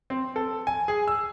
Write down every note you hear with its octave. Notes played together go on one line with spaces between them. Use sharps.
C4
A4
G#5
G#4
E6